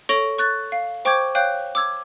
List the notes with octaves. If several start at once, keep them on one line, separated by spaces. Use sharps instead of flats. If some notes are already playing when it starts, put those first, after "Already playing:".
A4 C#5 C#6 A#6 D7 F7
C#6 F#6 A6
F5
C5 G5 C#6 D6 G6 G#6
C#5 F5 G5 F#6 G6
D6 E6 G#6